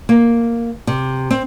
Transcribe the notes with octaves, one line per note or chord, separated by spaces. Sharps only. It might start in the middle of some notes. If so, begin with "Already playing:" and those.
A#3
C3
C4